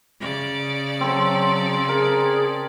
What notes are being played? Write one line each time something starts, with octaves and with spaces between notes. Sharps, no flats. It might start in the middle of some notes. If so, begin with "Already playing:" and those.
C#3 D5
F#3 C4 A4 C5
G#4 A#4